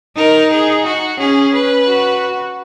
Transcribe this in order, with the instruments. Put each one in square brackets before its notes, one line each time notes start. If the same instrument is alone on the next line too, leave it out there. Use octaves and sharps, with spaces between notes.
[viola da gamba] D#4 [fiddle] A#4
[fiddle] G#4
F#4
[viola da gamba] C#4 [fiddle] G#4
[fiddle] B4
[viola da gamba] F#4